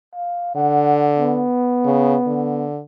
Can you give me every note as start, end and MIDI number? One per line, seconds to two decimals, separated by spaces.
0.14 0.55 77
0.56 1.46 50
0.56 1.05 78
1.18 2.68 59
1.85 2.15 49
2.26 2.80 50